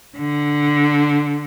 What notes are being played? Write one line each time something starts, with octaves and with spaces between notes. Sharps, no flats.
D3